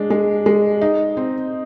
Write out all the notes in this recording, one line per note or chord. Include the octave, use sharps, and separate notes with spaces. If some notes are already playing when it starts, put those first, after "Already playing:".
Already playing: G#3 D4
G#3
G#3
D#4
C4